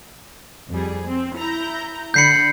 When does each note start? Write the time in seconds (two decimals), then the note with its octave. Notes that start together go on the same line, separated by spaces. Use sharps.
0.70 F2 G3 G#4
1.08 C4
1.38 E4 A#5 G6
2.14 D3 B5 G6 C7 C#7